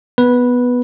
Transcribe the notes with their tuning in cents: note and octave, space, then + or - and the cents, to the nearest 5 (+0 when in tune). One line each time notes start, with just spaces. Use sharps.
B3 +0 B4 -10